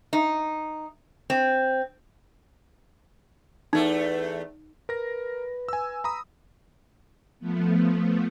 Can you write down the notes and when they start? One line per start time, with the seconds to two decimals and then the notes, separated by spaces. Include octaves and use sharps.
0.13 D#4
1.30 C4
3.73 E2 A3 D#4
4.89 A#4 B4 A#6
5.69 G#5 E6
6.04 A#5 B5 D#6
7.39 F3 A3 B3